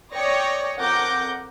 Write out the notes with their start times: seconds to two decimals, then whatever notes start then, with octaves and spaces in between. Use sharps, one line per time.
0.13 C#5 D5 G5 D#6 A#6 C#7
0.79 F2 A#4 F#5 D6 G6 A#6